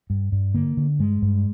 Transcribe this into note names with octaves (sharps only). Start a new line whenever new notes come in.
G2
G2
D3 A#3
D3
G2 G#3
G2